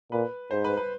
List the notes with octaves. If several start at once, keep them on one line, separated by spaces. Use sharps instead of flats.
A#2 B4
G#2 C5
B4
B4